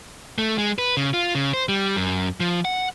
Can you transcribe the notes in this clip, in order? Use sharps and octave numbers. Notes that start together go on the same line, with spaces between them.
A3
G#3
B4
C#3
F4
C#3
C5
G3
F#2
F3
F#5